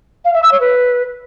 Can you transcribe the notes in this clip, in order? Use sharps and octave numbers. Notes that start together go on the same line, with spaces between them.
F5
E5
E6
C#5
B4